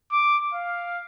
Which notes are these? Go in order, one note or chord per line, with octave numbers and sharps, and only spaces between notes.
D6
F5